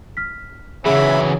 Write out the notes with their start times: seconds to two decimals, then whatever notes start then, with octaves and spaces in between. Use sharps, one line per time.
0.17 F6 B6
0.85 C#3 E3 F#3 C#4 G#4 E5 B5